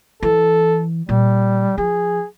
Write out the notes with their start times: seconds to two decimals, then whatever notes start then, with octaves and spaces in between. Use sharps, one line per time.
0.23 E3 A4
1.09 A#2 G3
1.78 F3 G#4